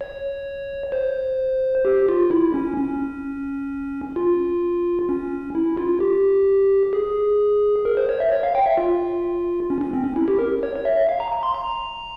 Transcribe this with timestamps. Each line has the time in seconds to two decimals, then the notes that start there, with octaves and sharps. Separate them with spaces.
0.01 C#5
0.92 C5
1.85 G4
2.09 F4
2.31 E4
2.54 C#4
2.77 C#4
4.16 F4
5.09 C#4
5.55 E4
5.77 F4
6.00 G4
6.93 G#4
7.85 A#4
7.97 C5
8.09 C#5
8.20 E5
8.32 C#5
8.43 F5
8.55 G5
8.66 E5
8.77 F4
9.70 C#4
9.81 C#4
9.93 C4
10.04 C#4
10.16 E4
10.28 G4
10.39 A#4
10.63 C#5
10.76 C#5
10.85 E5
11.09 F5
11.20 A#5
11.32 A#5
11.43 C6
11.54 A#5